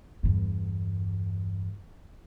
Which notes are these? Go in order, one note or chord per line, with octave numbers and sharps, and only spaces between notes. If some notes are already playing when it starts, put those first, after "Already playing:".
E2 G2